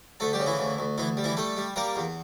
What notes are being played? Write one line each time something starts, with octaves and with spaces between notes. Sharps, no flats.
D2 A3 A4
G3 G4
C#3
E3 E4
D2
D2
D2 E3 E4
G3
E3 E4
G3 A3 A4
G3
G3 A#3 A#4
E2